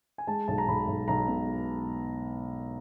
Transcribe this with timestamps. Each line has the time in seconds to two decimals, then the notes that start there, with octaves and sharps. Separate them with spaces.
0.18 G#5
0.27 G#3 A5
0.48 B1 A5
0.58 A#5
0.68 B1 B5
0.88 B1
1.08 B1 A#5
1.28 B2